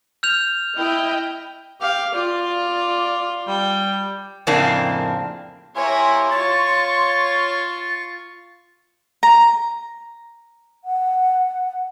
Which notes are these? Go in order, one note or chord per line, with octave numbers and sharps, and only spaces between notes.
F6 G6 F7
E4 D#5 G5
G4 F5
F4 D5
G3 G5
F2 A2 C#3 A#3 C4 D4
A#3 E4 G4 C#5 G#5 A#5 C6
F4 C#5 C#6 A6
A#5
F#5